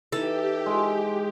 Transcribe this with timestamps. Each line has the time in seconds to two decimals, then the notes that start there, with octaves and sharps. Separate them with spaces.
0.12 E3 D#4 G4 A4
0.66 G#3